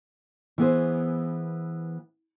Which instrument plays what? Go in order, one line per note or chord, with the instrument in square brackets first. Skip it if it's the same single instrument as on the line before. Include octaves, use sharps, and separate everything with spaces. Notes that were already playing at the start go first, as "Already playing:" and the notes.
[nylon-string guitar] E3 B3 G#4 C5